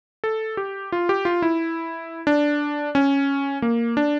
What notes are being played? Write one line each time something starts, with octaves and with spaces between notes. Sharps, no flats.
A4
G4
F4
G4
F4
E4
D4
C#4
A#3
D4